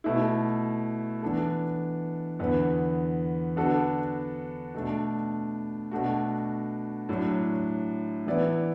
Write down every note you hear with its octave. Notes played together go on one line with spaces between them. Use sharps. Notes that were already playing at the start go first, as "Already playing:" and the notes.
B2 A3 E4
E3 B3 D4 A4
E2 D3 B3
D3 B3 D4 F#4 A4
B2 A3 D4
B2 A3 D4 F#4
A2 F#3 D4
E3 B3 E4 D5